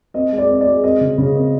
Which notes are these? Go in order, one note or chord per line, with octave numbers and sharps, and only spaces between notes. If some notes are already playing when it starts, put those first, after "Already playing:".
C4 D#5
G#3
D5
C4
D5
G#3
C4 D#5
C#3
C#3
C4